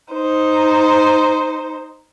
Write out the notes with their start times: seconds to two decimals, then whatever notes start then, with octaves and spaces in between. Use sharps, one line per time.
0.13 D#4 C5